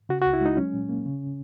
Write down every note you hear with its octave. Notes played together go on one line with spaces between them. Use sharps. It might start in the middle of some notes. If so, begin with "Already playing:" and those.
C#3 F#4
F#4
C#2
E4
G#3 D#4
F#3 C#4
A#2
A#3
C#3